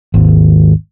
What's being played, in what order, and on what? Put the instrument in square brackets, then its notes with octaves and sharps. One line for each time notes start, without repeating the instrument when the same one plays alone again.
[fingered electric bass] G#1 D#2